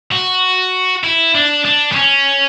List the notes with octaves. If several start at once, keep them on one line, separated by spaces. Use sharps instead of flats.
F#4
E4
D4
D4
B3
C#4